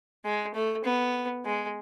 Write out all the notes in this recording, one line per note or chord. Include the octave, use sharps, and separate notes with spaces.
G#3
A3
B3
G#3